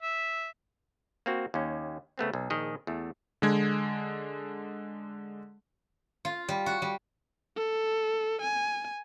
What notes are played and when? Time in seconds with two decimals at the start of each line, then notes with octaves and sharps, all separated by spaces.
0.03 E5
1.26 A#3 C4 F#4
1.54 D#2 C#4
2.18 C#3 A3 B3 C4
2.33 B1
2.50 A#1 D#3 G#4 D#5
2.87 E2 A3
3.42 D3 G#3 G#6
6.25 F4
6.48 G3
6.66 F#4
6.82 G3
7.56 A4
8.42 G#5